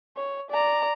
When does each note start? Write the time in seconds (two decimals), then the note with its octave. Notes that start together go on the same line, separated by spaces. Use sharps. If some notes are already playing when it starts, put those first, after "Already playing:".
0.17 C#5
0.51 D5 A#5